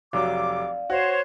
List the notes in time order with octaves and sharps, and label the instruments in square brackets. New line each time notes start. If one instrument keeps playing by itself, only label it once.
[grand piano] F1 F#3 [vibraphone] D5 F5 [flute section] D6
[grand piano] F#4 [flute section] C5 C#5